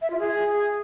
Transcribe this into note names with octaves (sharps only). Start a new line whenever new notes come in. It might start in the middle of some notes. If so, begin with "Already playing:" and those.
E5
F4
G#4